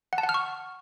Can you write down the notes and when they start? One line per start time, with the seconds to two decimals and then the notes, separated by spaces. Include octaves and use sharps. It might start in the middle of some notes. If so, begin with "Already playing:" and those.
0.13 F#5
0.18 A5
0.24 F#5
0.29 F6
0.34 C#6